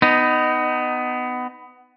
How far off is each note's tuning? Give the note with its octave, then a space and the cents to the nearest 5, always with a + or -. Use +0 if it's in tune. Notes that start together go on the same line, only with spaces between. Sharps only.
B3 +20 D#4 -10